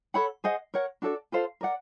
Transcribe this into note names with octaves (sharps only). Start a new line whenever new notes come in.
A4 C#5 F#5 B5
G#4 C5 D#5 F#5
A#4 C#5 F#5
D4 F#4 A4 D5
F4 A4 C5 F5
A#4 D5 F#5